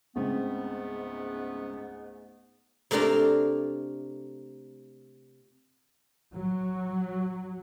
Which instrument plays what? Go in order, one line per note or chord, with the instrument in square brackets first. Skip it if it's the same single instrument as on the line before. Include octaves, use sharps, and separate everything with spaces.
[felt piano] C#2 C4 [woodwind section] G#2 A3 B3
[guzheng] C3 A3 A#3 D4 F4 A#4
[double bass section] F#3